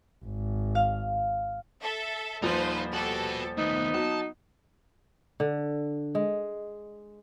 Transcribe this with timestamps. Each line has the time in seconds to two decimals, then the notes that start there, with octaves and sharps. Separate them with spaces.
0.24 G#1
0.75 F5
1.81 A4 E5
2.42 D#1 F3 D#4 F4 B4 C5
2.93 F#4 G4 A4 B4
3.58 D#3 A3 B3 D#4
3.94 F#3 A5
5.40 D3
6.15 G#3